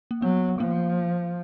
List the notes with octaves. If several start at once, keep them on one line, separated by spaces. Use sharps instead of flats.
A#3
F#3 B3
F3 A#3